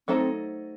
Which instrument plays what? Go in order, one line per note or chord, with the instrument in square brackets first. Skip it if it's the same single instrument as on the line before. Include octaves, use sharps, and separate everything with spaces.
[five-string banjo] F#3 A3 D#4 A4 C5 [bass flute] C4